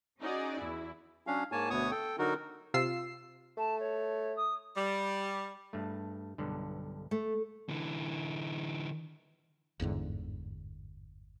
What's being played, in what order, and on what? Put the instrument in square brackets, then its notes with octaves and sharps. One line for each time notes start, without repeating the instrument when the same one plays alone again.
[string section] C#4 D#4 F#4 G#4 D5
E2 E4
[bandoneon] F#3 C#4 D4 F5
G#2 A#3 C#5 G#5 A5
D2 B2 B3 C#5 C#6 D#6
A4 G5
D3 F#3 D#4 F#4 A#4
[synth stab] C3 F4 E6 C7
[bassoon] A3 [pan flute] A5
[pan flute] C#5
D#6
[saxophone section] G3
[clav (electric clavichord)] G2 A3
B1 G2 D3
[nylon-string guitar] A3
[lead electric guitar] D3 E3
[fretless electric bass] G1 E2 G#2 D3